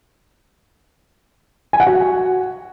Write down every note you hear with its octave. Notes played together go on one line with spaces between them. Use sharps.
G#5
F#5
F#4